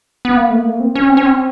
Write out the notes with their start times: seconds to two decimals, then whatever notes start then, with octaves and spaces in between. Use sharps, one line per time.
0.25 B3
0.37 A#3
0.51 A3
0.64 A#3
0.80 C4
0.95 C#4
1.10 C4
1.17 C#4
1.25 C4